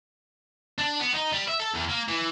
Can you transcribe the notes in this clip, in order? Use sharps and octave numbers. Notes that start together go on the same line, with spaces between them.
D4
B3
D#4
G3
E5
A4
E2
A#3
E3